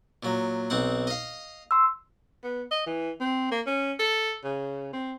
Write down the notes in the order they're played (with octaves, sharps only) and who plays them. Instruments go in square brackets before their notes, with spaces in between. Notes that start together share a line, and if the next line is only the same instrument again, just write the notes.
[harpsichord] A#2 F#3
B1 C4 F#5
D#5 F5
[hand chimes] C6 E6
[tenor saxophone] B3
D#5
E3
C4
A#3
C#4
A4
C#3
C4